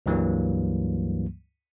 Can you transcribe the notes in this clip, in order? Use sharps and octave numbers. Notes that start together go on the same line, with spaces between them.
C#2 G2 E3 F#3 G3 A#3